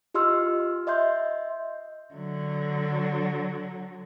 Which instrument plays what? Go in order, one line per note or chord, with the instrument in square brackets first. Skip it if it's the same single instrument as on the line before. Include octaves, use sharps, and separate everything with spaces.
[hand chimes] F4 G4 D#5 C6 E6 F6
D#5 E5 C6 G6
[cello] D3 F#3